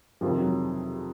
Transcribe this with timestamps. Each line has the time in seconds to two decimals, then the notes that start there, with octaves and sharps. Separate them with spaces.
0.21 F2 C3 D#3 F3
0.38 F#3